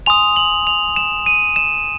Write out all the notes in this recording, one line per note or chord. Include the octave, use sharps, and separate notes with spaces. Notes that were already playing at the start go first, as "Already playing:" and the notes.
G#5 C6 D#6 F7
F#7
F7
E7
D#7
E7